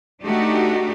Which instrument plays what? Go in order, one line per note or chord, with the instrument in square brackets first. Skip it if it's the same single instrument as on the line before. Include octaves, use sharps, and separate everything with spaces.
[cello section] A3 D4 D#4 F#4 G4